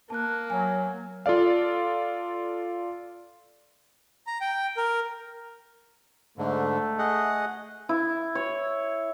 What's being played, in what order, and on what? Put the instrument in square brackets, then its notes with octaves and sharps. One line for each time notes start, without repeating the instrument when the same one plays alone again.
[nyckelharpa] A#3 [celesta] A5 F#6
[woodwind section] F#3 [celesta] G#5
[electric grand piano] F4 A4 D5 F5
[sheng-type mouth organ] A#5
G5
A#4
[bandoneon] G#2 D3 [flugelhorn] A3
[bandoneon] G#4 D#5 F#5
[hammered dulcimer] E4
C#5